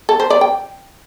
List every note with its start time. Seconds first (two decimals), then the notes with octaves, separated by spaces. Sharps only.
0.09 A4
0.20 C5
0.30 D5
0.41 G5